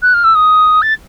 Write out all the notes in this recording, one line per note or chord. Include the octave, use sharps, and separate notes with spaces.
F#6
F6
E6
D#6
A6